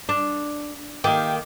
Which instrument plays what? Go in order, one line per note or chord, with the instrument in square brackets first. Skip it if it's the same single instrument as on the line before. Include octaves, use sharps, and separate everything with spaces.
[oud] D4
[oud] D#3 A#3 [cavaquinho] G4